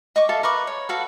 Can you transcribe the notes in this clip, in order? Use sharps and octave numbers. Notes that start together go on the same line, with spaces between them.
D#5 C#6 D6
A4 E5 F5 C6
A#4 B4 C#6 D6
C#5
F#4 A4 B4 F5